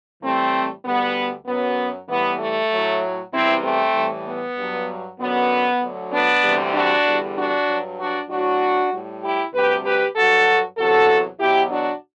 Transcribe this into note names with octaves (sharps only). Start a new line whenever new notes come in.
A2 E3 G3 A3 C4
D2 D3 G3 B3
F#2 F#3 B3
A2 E3 G3 B3
A3
A2 F#3
E2 C3 E3 G3 C4 E4
A3 C4
A2 E3 G3
B3
G2 F#3
F#2 D3 F#3 B3
D2 D3 F#3
B3 D4
D2 C3 E3 G3
D4 F#4
E2 D3 G3
D4 F#4
G2 F#3
D4 F#4
A2 F#3 D4 F#4
A2 G3
E4 G4
D2 C3 G3 G4 B4
G4 B4
G2 F#3 F#4 A4
E2 C3 F#3 F#4 A4
E2 B2 F#3 E4 G4
D4 F#4